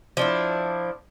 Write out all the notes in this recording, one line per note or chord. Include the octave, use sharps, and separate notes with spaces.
F3 D4 E4